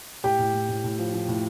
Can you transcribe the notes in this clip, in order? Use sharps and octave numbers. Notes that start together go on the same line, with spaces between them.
A2 G4 G5
A2
A2
A2
A2
F3
F3
A2